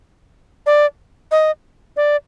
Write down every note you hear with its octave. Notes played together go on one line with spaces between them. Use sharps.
D5
D#5
D5